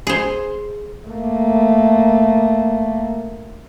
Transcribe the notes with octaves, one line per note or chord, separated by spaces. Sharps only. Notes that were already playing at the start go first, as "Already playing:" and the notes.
G#4 C5
A3 A#3